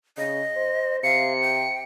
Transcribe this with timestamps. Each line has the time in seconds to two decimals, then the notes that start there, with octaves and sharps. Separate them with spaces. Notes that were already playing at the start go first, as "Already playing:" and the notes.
0.17 C#3 D#5
0.57 C5
1.03 C3 F5 C#7
1.42 G5